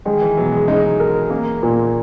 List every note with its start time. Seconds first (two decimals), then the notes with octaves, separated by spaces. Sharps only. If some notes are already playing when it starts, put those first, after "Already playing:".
0.05 D#3 G#3
0.22 E3
0.37 B2 F#3
0.52 G#3
0.68 G#3 D#4
1.00 A#4
1.30 A#3
1.63 A#2